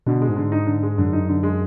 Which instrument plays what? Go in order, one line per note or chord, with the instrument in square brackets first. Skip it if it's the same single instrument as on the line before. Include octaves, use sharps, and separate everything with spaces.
[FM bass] B2 [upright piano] D3
[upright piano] G#3
[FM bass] G#2
[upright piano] D3
D#4
D3
G#3
[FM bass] F#2 [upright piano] D3
[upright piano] D#4
D3
G#3